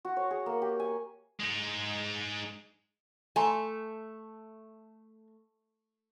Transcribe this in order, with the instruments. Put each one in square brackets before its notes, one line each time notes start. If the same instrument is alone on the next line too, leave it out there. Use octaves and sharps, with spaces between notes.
[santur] F#4
C#5
G#4
A#3
G4
G#5
[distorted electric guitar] G#3 D#4
[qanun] A3 [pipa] G#5 A#5 C6